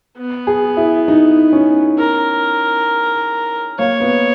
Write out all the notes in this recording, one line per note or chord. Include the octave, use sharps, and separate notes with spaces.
B3
G#4
E4
D#4
C#4
A#4
A#3 C#5
B3